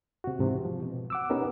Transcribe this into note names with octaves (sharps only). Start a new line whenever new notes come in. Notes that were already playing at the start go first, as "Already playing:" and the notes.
C3 F#4
G#2 C3 E3
F3
B2
F#5 D6 E6
B3 C#4 D#4 G4 A#4